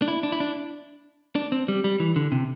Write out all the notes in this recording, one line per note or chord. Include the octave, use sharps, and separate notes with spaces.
D4
E4
D4
E4
D4
D4
C4
G3
G3
E3
D3
C3